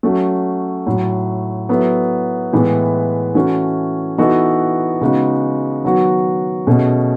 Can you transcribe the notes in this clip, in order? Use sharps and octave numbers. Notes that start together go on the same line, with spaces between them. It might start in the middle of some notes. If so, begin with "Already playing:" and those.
F#3 A3 C#4 F#4
A2 F#3 A3
F#3 B3 E4 A4
A2 E3 G#3 B3
E3 A3 C#4 F#4
E3 B3 D#4 F#4 A4
C#3 G#3 B3 D#4 F#4
D#3 F#3 B3 F#4
B2 A3 C#4 G#4